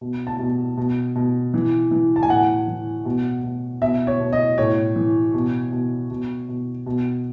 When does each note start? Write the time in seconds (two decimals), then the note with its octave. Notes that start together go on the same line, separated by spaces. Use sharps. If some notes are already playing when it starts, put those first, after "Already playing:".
0.01 B2
0.27 A5
0.39 B2
0.77 B2
1.15 B2
1.54 E3
1.91 E3
2.16 A5
2.23 G#5
2.30 A2 F#5
2.67 E3
3.05 B2
3.43 B2
3.82 B2 E5
4.07 C#5
4.20 B2
4.33 D#5
4.58 A2 C#5
4.96 E3
5.34 B2
5.72 B2
6.10 B2
6.48 B2
6.86 B2